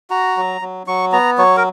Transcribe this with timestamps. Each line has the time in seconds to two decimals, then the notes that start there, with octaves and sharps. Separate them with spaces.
0.10 F#4 A#5
0.37 F#3
0.61 F#3
0.87 F#3 C#6
1.12 B3 A#5
1.38 F#3 C#5
1.57 A#4